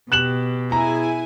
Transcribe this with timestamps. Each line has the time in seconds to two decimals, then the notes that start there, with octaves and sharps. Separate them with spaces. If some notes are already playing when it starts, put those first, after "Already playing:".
0.12 B2 G4 F#6 E7 F#7
0.72 E4 G#4 G#5 A#5